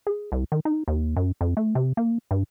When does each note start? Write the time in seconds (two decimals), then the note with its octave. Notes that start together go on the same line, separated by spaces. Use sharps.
0.07 G#4
0.32 C2
0.52 D#3
0.65 D#4
0.88 D#2
1.16 F#2
1.41 F2
1.57 A3
1.75 C3
1.97 A#3
2.31 G2